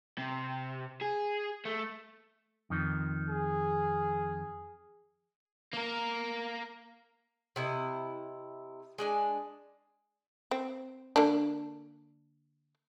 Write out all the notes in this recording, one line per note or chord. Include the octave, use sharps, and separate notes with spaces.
C3
G#4
A3
F2 D#3
G#4
A#3 A#4
C3 E4 D#5
G#3 D4 G#5
C4
D3 A#3 D4